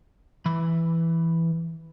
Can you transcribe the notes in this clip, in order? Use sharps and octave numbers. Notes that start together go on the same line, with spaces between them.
E3 B5